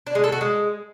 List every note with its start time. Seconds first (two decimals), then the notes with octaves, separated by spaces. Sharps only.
0.07 D4
0.15 G#3
0.24 A4
0.32 F#4
0.41 G#3